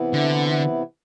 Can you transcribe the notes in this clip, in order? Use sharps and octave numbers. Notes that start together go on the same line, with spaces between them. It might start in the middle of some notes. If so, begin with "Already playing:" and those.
Already playing: C3 E3 B3 E4
D3